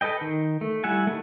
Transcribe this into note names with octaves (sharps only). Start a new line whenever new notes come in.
A4 B4 D#5 G5
D#3
A3
G3 E4 E5 F#5 G#5
D#3 A3